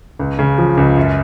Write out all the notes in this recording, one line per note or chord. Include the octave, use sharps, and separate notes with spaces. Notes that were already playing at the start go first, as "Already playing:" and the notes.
C#2
C#3
F3
C#2
F#2